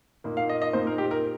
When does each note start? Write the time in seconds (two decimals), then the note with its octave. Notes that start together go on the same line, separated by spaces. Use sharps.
0.24 A#2 A#3 D#4
0.37 F5
0.49 D#5
0.62 D#5
0.73 A#2 A#3 D#4 C5
0.87 A#4
0.98 G4
1.11 A#4